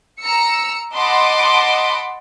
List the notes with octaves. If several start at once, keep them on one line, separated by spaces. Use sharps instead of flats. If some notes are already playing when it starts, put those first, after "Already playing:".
A#5 E6 C#7
D#5 F#5 A5 B5 C6 D6